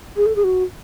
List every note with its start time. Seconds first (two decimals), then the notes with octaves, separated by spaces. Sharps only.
0.17 G#4
0.26 A4
0.36 G#4
0.44 F#4